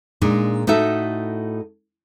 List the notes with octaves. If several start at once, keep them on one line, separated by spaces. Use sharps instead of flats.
A#2 G#3 D4 D#4
A2 D#4 F#4 A4 E5